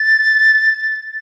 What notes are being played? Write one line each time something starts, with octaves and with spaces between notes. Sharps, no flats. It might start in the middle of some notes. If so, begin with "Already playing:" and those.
Already playing: A6